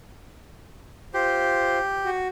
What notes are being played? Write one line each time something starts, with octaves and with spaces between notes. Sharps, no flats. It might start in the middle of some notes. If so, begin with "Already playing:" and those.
F4 G4 C5
F#4